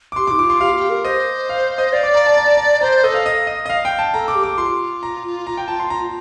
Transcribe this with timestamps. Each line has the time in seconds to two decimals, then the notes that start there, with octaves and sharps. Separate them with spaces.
0.12 D6
0.16 G4 C6
0.27 D6
0.31 D#4
0.38 F4 D6
0.50 C6
0.61 G4 F5
0.76 G4
0.90 A#4
1.04 C5 D#5
1.49 F5
1.78 D#5
1.93 D5 F5
2.03 D6
2.15 A#5
2.26 A5
2.37 A#5
2.47 A5
2.57 A#5
2.81 C5 A#5
3.04 A4 D#5
3.14 F5
3.26 D#5
3.47 D#5
3.66 D#5
3.70 F5
3.85 G5
3.99 A5
4.14 A4 A#5
4.28 D6
4.36 G4
4.43 D6
4.58 F4 C6
5.03 A#5
5.47 A#5
5.57 G5
5.68 A5
5.80 C6
5.90 A#5